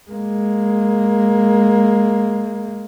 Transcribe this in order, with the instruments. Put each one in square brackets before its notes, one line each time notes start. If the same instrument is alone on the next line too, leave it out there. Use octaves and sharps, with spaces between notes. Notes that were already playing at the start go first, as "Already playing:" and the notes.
[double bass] G#3 A#3